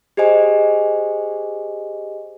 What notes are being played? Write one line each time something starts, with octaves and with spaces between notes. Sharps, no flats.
G4 G#4 C5 D#5 G#5